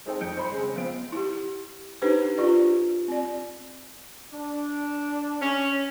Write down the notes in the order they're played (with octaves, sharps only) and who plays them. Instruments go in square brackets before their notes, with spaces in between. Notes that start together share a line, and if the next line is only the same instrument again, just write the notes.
[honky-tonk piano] G#3 C4 D#4 A4 C5 G5
F2 D#4 G6 C#7 D7
C5 B5 C6
C#3 G#3 C4
F3 B3 C4 F5 D7
[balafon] E4 G4
D4 D#4 G4 A4 B4 C5
D4 F4 G4 D5
C4 D5
[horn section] D4
[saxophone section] C#4